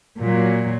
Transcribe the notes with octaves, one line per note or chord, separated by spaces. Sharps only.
A#2 F#3